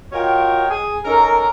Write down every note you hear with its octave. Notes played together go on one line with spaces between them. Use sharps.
F4 F#4 A#4 C#5 D#5 G5
G#4
C#4 D#4 A4 A#4